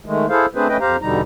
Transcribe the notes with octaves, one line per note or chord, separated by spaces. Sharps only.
D#3 G#3 A3
E4 G#4 A4 C5 F5
A3 C4 D4 G#4 B4 C5
A3 C#4 B4 D#5 G5
F2 G4 C5 F5 A#5
E2 B2 D3 G3 D#4 A#5